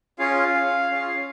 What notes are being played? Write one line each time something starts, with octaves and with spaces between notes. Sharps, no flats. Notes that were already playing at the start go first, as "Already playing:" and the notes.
C#4 F4 G#4 F5
C#4 F4 G#4